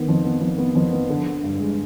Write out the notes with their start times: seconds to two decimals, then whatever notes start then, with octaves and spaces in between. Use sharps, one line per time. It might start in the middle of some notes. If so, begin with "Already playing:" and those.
Already playing: D#3 B3
0.09 F2
0.25 B3
0.41 F2
0.58 B3
0.75 F2
0.93 B3
1.10 D3
1.26 D3
1.43 G2
1.59 G#3